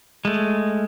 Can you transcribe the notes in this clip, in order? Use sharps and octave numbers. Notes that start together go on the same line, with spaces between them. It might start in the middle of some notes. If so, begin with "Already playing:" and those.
G#3 A3